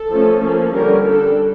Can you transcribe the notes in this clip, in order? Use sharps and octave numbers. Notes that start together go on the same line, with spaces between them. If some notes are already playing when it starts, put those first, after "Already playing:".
Already playing: A4
F3 A3 C#4
F3 A#3 C#4
D3 G3 C#4 A#4
G3 D4 A4